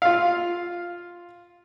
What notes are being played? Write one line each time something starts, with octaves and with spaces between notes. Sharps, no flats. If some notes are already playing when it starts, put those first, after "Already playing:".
F4 F5